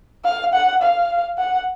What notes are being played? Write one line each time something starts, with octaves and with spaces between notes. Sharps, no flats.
F5
F#5
F5
F#5